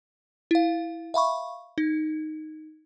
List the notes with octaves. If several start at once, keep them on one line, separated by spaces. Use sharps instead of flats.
E4 F5
E5 F5 B5 C#6
D#4